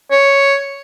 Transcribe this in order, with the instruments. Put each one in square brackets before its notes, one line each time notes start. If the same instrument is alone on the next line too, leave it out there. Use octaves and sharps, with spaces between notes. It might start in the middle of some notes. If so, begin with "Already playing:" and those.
[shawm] C#5